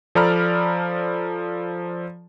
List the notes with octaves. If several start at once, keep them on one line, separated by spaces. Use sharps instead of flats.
F3 A4 D5 A#5 B5 F6